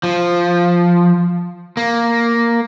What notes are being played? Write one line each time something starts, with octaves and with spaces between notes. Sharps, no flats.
F3
A#3